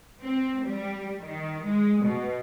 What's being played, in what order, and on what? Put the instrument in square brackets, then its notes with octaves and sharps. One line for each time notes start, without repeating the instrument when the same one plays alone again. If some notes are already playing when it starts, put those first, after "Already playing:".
[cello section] C4
G3
D#3
G#3
B2